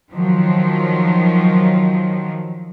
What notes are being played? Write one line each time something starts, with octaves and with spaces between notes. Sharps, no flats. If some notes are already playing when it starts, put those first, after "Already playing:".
D#3 F3 F#3